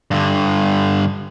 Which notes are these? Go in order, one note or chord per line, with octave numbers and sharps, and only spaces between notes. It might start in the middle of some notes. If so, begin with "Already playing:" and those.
G2 D3